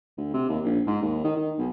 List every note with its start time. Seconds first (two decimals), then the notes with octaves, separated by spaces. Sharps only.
0.17 D2
0.34 C3
0.49 D#2
0.64 A#1
0.87 G#2
1.02 D#2
1.24 D#3
1.36 D#3
1.58 B1